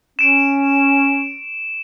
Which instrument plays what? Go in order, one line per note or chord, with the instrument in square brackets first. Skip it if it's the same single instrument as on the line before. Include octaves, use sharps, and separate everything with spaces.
[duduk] C#4 [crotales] D7 E7